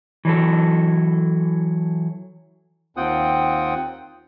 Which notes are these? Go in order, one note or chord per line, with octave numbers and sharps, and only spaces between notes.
E3 F#3 A4
D#2 C4 F4 F#5 G5 D#6